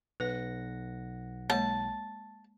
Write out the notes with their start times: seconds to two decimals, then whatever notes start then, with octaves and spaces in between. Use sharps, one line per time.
0.20 B1 B4 F#5 A#6
1.50 G#3 A#3 C#5 A5